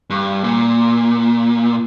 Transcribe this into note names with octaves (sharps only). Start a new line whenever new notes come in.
G2
A#2